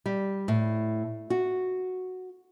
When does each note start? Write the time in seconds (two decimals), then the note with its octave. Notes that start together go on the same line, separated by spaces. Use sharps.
0.06 G3
0.48 A2
1.30 F#4